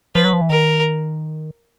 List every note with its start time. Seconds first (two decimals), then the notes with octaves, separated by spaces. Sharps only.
0.15 F3 B4
0.24 F#3
0.33 F3
0.41 E3
0.49 D#3 A#4